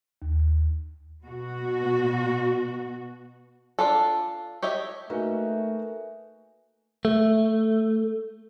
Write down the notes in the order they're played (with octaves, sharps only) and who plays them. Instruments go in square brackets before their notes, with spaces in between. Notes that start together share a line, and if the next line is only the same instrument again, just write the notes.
[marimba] D#2
[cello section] B2 F#4
[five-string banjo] D4 F4 A4
G4 C#5 D#5 E5
[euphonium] A3 [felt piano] A#3 D#4 F#4 [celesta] B4 E5 G#5
[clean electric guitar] A3